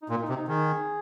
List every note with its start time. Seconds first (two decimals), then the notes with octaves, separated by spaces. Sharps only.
0.03 D#4
0.09 A#2 F4
0.22 D#4
0.29 C3
0.35 D#4
0.48 D#3 G#4